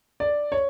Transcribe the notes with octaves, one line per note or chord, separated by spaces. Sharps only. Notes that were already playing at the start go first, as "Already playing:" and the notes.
D5
C#5